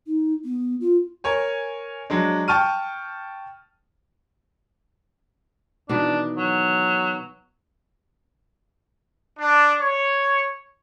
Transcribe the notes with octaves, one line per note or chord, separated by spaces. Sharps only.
D#4
B3
F4
A#4 C#5 G#5
F#3 G#3 D4
G5 A5 C#6 F6 D#7
B2 D#3 E3 D4
F#3
D4
C#5